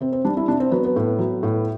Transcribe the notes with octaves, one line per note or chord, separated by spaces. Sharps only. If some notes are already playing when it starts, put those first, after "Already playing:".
C3 C4
C4
G3 D4
E4
C3 D4
C4
F#3 B3
B3
A2
F#3
A2